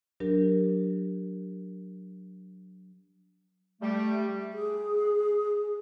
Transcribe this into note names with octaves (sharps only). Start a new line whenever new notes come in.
F#3 D4 G4 A#4
G3 A3
G#4